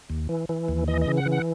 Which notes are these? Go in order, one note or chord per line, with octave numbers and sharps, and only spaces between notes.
D#2
E3
E3
D#2
E3 D#5
D#5
C#3
F#5
E3
F#5